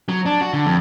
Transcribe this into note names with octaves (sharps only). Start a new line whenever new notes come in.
F#3
D4
F#4
D3
F2